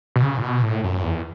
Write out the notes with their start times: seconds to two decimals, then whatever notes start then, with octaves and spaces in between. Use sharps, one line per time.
0.16 B2
0.22 C#3
0.37 A2
0.42 B2
0.62 A2
0.83 F#2
1.03 E2